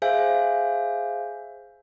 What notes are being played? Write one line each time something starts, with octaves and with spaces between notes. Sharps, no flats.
G#4 C5 E5 F5 G#5 G6